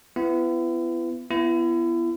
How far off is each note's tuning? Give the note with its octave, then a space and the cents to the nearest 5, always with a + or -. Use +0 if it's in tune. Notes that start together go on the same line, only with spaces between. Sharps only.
B3 +25 E4 +40
B3 +0 E4 +35 B4 +0